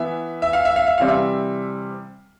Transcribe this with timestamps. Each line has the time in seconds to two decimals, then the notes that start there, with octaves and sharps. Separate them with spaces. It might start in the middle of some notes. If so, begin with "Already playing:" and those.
Already playing: E3 B3 E5
0.42 E5
0.53 F5
0.65 E5
0.76 F5
0.87 E5
0.98 C3 E3 G3 C4 F5
1.08 E5